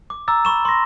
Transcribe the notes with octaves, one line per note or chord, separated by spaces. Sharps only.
D6
A#5 D6 E6 A6
B5 C#6 E7
C6 A#6